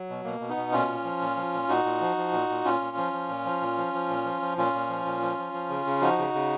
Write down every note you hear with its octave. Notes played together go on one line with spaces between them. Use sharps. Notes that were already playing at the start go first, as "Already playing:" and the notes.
Already playing: F#3
B2
B2 A#3
B2
B3 D#4
B2
A#2 C#4 F4
A#2
F3
A#2
F3
A#2
A#2 D#4 F#4
A#2
F3
F3
A#2
A#2
A#2 C#4 F4
A#2
F3
F3
A#2
F3
A#2
F3
F3
A#2
F3
F3
A#2 C#4 F4
A#2
F3
A#2
F3
F3
F3
C#3
C#3
F3 D#4 F#4
C#3
C#3